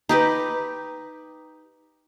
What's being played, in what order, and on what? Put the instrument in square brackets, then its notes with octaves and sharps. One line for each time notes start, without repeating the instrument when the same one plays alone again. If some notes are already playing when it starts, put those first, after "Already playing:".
[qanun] D#4 G4 B4